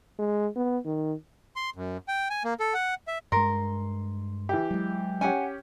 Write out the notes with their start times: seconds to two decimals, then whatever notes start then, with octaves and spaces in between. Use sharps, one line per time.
0.19 G#3
0.56 B3
0.85 D#3
1.56 C6
1.76 F#2
2.08 G5
2.30 G#5
2.44 A#3
2.60 A4
2.74 F#5
3.07 E5
3.32 G2 G#3 A#4 C6
4.49 E3 G4
4.71 F#3 G#3
5.21 C#4 G4 F#5 G#5